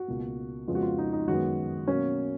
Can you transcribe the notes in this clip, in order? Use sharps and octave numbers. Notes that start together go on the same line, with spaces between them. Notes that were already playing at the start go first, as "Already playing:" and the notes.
Already playing: F#4
C#2 B2 A#3
F2 C#3 G#3 B3 F4
F#4
F4
D#4
D#4
F#2 D#3 G#3 B3 F#4
B2 F#3 A#3 C#4